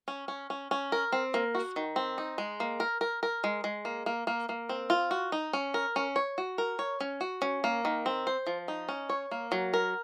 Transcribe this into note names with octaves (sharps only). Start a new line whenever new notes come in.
C#4
C#4
C#4
C#4
A#4
C4
A#3
F#4
D#3
C4
D#4
G#3
A#3
A#4
A#4
A#4
G#3
G#3
A#3
A#3
A#3
A#3
C4
F4
F#4
D#4
C#4
A#4
C#4
C#5
F#4
A#4
C#5
C#4
F#4
C#4
A#3
D#3
C4
C5
F3
D#4
C#4
C#5
A#3
F#3
A#4